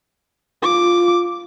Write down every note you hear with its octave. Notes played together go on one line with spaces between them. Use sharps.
F4 D6